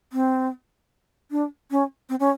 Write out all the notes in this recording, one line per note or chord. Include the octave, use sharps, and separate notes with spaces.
C4
D4
C#4
C4
C#4